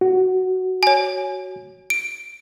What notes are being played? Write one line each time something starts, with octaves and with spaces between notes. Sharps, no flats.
F#4
C#5 G#5
D7